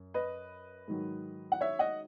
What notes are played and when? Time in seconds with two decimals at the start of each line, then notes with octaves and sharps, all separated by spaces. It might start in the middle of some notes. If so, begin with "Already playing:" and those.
Already playing: F#2
0.14 B4 D#5
0.88 G#2 D#3 F#3
1.52 F#5
1.61 C#5 E5
1.79 D#5 F#5